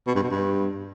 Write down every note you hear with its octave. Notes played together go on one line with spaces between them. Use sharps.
B2
G2
B2
G2